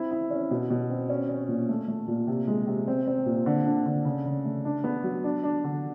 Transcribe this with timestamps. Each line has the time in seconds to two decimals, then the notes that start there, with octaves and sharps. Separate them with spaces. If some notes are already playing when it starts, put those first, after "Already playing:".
Already playing: C4 E4
0.11 E4
0.31 C#4
0.51 B2
0.70 B2
0.90 C4
1.09 C#4
1.29 C#4
1.48 A#2
1.69 A3
1.88 A3
2.08 A#2
2.27 C3
2.47 G#3
2.67 C3
2.88 C4
3.07 C4
3.26 A#2
3.46 D3
3.66 D4
3.86 D3
4.05 C#3
4.25 C#3
4.45 A3
4.65 D4
4.84 B3
5.04 F#3
5.24 D4
5.44 D4
5.64 D3